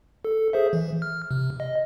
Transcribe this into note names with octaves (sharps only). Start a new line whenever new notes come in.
A4
G#4 C5 E5
E3
F6
C3
D#5